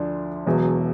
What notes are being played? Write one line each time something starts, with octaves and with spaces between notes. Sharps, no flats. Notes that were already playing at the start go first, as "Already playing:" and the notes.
Already playing: D2 D3 F3 D4
E1 E2 B2 F#3